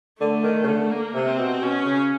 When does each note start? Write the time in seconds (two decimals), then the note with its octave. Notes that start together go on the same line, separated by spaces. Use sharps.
0.21 D3 A3
0.43 D#3
0.63 C#3
0.67 D3
0.90 A#3
1.14 C3
1.27 C4
1.38 B2
1.61 B2 C#4
1.85 C#3